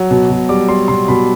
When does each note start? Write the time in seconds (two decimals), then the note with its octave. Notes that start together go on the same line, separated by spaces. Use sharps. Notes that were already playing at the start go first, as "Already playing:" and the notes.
Already playing: F#3
0.11 B2
0.30 B2
0.49 G3 D6
0.69 G3 C6
0.88 B2 C6
1.08 B2 B5